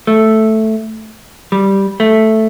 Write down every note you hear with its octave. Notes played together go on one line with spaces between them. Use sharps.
A3
G3
A3